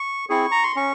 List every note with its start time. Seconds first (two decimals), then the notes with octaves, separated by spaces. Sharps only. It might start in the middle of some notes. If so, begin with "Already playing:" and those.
Already playing: C#6
0.29 C4 E4 G#4 C#6
0.51 A#5
0.63 C6
0.76 C#4 C#6